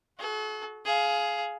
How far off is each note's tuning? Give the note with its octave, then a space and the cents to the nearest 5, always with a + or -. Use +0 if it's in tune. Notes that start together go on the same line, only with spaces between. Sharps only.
F#4 +0 A4 -45
G#4 +15 F5 +0